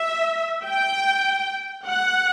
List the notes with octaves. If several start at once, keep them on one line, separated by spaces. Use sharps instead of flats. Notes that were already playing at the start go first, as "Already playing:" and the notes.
Already playing: E5
G5
F#5